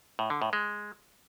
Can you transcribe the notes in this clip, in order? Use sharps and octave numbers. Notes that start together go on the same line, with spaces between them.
A2
D3
A2
G#3